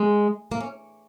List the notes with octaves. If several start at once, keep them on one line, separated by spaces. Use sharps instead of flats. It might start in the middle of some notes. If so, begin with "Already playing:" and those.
Already playing: G#3
A#3
C#4